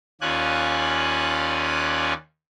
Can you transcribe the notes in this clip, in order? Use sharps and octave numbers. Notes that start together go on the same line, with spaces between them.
D#2 C#4 F4 D5 G#5 F#6